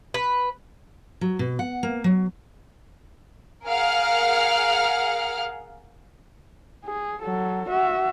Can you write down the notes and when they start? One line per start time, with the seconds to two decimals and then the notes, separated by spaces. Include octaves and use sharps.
0.14 B4
1.21 F#3
1.39 B2
1.59 F#5
1.83 A#3
2.04 F#3
3.65 G#4 A#4 F5 F#5 F6
6.85 G#4
7.23 F#3 A4
7.69 F#4 E5